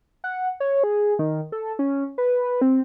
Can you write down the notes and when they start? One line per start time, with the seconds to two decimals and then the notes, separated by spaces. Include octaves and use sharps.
0.24 F#5
0.60 C#5
0.84 G#4
1.19 D#3
1.52 A4
1.79 C#4
2.18 B4
2.61 C4